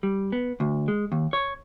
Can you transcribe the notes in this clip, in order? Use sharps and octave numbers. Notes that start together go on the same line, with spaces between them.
G3
B3
D2
G#3
D#2
C#5